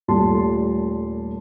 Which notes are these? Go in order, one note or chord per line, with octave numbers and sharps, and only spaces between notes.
D#1 A#2 G3 A3 A5 C6